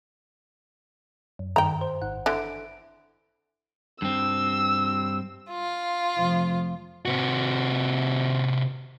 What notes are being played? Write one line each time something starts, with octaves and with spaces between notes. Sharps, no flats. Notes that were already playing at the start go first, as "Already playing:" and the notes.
F#2
G2 D#3 G5 A#5
C5
G#1 F#5
D3 E3 D7
G2 C4 E6
F4
F1 F3
C3 F#4